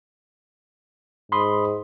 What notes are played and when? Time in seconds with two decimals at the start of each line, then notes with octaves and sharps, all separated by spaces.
1.32 G#2 B5 C6 D#6